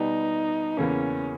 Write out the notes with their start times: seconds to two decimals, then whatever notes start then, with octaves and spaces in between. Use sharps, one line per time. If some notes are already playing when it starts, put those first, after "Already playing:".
Already playing: B2 G3 B3 D#4
0.77 E2 C#3 E3 A#3 C#4